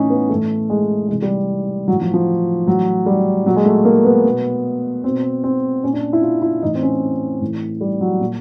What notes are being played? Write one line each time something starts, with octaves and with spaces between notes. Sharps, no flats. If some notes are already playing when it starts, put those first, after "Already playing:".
Already playing: A2 E3 C#4 D#4
B3
A2 E3 A3
G#3
C3 E3 G#3
G3
A2 E3 F#3
F3
F3
A2 E3 F#3
G3
A#2 F#3
G#3
A3
A#3
B3
B2
B2 C4
C4
A#2 C#4
D4
E4
F4
E4
A2 E3 D#4
C4
C#4
A2 E3
G3
F#3
A#2